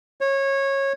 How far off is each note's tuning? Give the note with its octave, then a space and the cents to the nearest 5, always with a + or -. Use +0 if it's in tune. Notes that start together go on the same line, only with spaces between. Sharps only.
C#5 -20